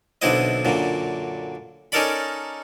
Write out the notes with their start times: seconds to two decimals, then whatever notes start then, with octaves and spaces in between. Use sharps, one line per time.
0.22 B1 D3 C4 E4 B4 D#5
0.65 F#2 A#2 D3
1.92 C#4 D#4 A4 A#4 D5 B5